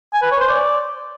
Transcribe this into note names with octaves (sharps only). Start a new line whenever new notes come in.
G#5
B4
C#5
C5
D5